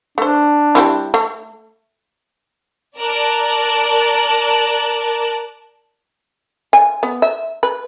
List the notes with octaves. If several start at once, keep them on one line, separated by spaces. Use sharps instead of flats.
A3 D4 C5
G3 C4 E4
A3
A#4 D5 A5 F#6
G#5
B3
E5
B4